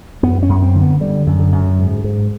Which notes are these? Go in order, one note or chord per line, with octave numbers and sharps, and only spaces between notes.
F#2 B3
C#4
F#2
C4
D3
B3
D3 G3
F#2
D3
F#2
G#2
G#2